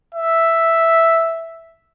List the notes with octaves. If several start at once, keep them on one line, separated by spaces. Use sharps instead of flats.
E5